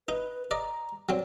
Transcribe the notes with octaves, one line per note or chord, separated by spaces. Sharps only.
D#4 B4
D5 D#5 A#5
F#3 C4 D5